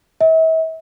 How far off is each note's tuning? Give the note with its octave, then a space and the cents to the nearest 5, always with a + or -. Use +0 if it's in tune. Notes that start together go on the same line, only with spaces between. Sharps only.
E5 -40